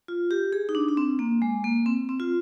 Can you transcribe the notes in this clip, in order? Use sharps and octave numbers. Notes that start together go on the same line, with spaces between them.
F4
G4
G#4
D#4
D4
D4
C4
A#3
G#3
A#3
C4
C4
F4